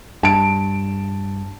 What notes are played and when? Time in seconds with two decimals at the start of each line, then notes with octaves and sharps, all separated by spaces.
0.23 G2 A5 D7